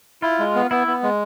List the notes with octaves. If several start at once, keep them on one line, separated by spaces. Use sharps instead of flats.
E4 F4
G#3
B3
B3 E4
B3
G#3